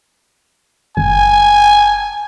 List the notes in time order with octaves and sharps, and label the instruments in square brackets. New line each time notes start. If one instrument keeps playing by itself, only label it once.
[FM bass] F#1 [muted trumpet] G#5